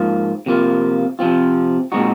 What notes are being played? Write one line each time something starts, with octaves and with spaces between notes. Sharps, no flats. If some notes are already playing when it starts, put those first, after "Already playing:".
Already playing: G#2 F3 A#3 F4
C3 F3 A#3 F4
C3 F3 C4 F4
A#2 G#3 C4 D#4 F#4